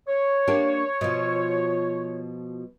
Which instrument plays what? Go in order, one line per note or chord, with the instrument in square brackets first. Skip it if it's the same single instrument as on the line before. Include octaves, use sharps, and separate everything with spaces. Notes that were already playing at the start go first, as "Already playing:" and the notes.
[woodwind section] C#5
[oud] A#3 D4 G4
B2 F3